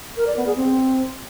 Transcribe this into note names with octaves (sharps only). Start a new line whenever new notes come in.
A#4
D5
B3
G#4
C4